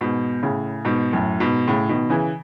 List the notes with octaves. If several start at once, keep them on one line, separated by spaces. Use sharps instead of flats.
G#2 B2
A2 C#3
G#2 B2
F#2 A2
G#2 B2
A2 C#3
B2 D#3
C#3 E3